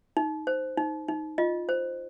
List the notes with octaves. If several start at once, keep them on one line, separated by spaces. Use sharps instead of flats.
D#4
C5
D#4
D#4
F4 D#5
C5